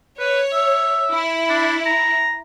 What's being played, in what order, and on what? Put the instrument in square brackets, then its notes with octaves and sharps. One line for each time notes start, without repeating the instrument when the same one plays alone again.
[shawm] B4 [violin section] C#5
[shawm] E5
[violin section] E4
[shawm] D4
A#5